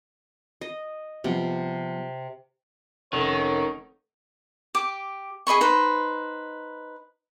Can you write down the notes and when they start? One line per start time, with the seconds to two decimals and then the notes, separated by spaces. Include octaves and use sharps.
0.61 D#5
1.24 C3 F3 G3 B3
3.13 F1 D#3 C#4 C#5
4.75 G4 D6
5.47 G#4 D#5 B5 C#6
5.61 D#4 B4 C5